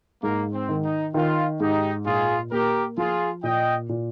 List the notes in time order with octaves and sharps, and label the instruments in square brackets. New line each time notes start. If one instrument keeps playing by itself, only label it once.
[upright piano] G#2 [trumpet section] A#3
[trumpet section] C4
[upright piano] D#3
[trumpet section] D#4
[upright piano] D#3 [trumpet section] F4
[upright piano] G#2 [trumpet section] D#4 G4
[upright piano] A#2 [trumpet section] F4 G#4
[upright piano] A#3 [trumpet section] G4 A#4
[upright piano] F3 [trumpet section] F4 G#4
[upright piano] A#2 [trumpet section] D#5 G5
[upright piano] A#2